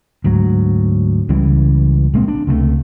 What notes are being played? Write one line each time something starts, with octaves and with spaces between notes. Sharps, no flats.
D2 G#2 F#3
C#2 C#3 E3 G3
A#1 G#3 A#3 C4
D4
C#2 C3 G3 A3